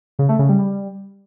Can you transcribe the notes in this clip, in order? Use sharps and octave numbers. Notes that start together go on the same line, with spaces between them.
C#3
A3
C#3
G3
G3